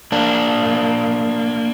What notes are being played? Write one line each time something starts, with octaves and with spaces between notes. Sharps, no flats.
A#3 D4